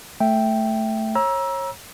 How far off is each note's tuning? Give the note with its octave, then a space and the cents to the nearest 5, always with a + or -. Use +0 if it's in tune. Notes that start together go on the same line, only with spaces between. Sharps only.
A3 +0 E5 +0 G5 +0
C#5 -30 A#5 +30 E6 +0